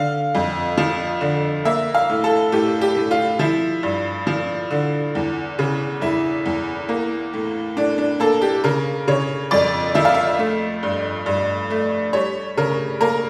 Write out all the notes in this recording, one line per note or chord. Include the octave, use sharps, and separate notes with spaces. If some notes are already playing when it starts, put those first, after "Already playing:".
Already playing: D3 F5
F2
F3
D3
A#3 E5
F5
A2
A4
A2 G4
G4
A2
F4
F3 E4
G2
F3
D3
E2
C#3
E2 E4
E2
A#3
A2
A2 D4
D4
A#3 A4
G4
C#3 A#4
C#3 C#5
F2 D5
F3 E5
F5
E5
A3
G2
G2
A3
G3 C#5
C#3 A#4
A#3 A#4